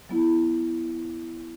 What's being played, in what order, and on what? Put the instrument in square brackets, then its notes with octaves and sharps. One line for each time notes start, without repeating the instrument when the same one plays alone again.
[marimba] F#3 B3 E4